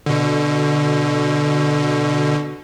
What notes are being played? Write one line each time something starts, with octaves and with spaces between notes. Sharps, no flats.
B2 D3